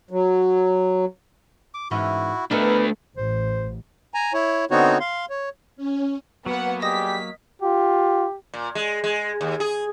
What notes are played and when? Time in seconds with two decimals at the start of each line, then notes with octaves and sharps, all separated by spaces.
0.11 F#3
1.74 D6
1.91 G#2 E3 C#4 E4 F#4
2.51 A3 B3 D4 E4 A#4 B4 D#5
3.17 A1 C5
4.14 G#5 A#5
4.33 E4 C#5
4.71 D3 B3 C4 D#4 F#4 C#5
5.00 F5 C6
5.30 C#5
5.76 C#4
6.46 F#3 A#3 B3 F#5
6.82 G3 G4 G#4 D#5 D#6 A#6 B6
7.62 F4 G4
8.54 A#2
8.75 G#3
9.04 G#3
9.41 D#2
9.60 G#4